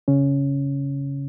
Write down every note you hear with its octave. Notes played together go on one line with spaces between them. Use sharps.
C#3 C#4